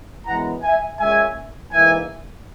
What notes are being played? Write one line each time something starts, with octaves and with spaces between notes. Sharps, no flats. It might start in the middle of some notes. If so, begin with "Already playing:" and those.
F#2 E3 G#3 B3 F#5 A#5
E5 G#5
A#2 G#3 C#4 E5 G#5
G#2 E3 A#3 E5 G#5